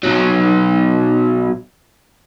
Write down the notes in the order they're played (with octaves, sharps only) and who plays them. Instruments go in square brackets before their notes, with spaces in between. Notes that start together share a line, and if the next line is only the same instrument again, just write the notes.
[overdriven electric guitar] B1 F#3